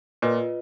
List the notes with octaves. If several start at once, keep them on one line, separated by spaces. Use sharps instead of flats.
A#2 F4 B4 D#5